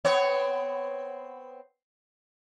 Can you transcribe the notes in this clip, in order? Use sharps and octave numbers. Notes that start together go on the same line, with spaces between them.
B3 C4 C#5